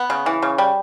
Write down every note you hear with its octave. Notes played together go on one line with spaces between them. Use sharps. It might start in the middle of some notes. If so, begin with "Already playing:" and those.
Already playing: B3
C#3
E3
C#3
G3